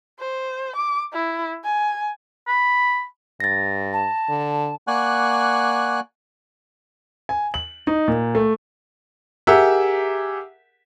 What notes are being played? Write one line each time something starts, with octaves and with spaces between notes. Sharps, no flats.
C5
D6
E4
G#5
B5
G2 A6 A#6
A5
D3
A#3 D5 F#5 G#5 C#6 F#6
G#5
F#7
D#4
A#2
A3
G4 G#4 A#4 E5 F#5 E6